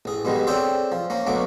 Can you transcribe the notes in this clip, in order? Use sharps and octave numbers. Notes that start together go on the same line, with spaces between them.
A1 G#4
G2 B2 D3 G3 G#3
C4 D4 G#4 A4 C#5 G5
F3
A#3 C#4
D2 B2 F#3 A3 D6